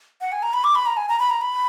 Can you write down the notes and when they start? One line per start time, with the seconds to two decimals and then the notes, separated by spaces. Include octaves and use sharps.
0.21 F#5
0.32 G#5
0.43 A#5
0.54 B5
0.64 D6
0.75 B5
0.86 A#5
0.97 G#5
1.09 A#5
1.19 B5
1.30 A#5
1.41 B5